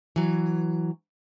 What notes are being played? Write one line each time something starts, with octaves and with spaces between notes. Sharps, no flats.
E3 F#3